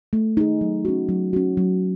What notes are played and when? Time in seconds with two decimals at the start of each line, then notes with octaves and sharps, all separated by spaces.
0.13 A3
0.37 D#4 G#4
0.61 F#3
0.85 C#4 F#4
1.09 F#3
1.33 C#4 F#4
1.57 F#3